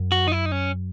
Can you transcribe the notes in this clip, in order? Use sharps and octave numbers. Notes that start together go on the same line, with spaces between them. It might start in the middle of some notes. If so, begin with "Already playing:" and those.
Already playing: F#2
F#4
D#4
E4
D#4
C#4